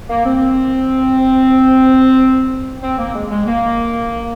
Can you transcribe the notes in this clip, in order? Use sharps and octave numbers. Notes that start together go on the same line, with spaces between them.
A#3
C4
C4
A#3
G#3
G#3
A#3